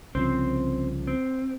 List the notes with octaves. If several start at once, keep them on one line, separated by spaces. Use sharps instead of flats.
C2 C#3 F3 C4 C5
C4